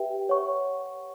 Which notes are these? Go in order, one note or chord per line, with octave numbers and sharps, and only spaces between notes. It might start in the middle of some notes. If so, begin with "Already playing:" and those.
Already playing: G4 B4 E5 G5
C#5 F#5 C#6